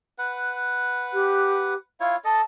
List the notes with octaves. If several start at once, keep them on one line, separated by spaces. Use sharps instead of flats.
B4 F#5
G4
E4 F4 C#5 F5
A4 D#5 A5